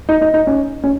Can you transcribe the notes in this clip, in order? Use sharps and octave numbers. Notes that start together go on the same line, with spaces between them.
D#4
D#4
D#4
C#4
C#4